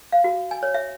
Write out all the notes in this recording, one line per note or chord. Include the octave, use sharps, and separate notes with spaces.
F5
F#4
G#5
C#5
E5